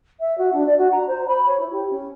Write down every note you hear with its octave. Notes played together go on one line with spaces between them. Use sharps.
E5
F#4
D4
D5
F#4
A#5
C5
B5
C#5
E4
G4
C#4